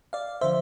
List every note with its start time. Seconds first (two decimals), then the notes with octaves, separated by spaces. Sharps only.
0.13 D5 F5
0.41 D3 F3 C5 E5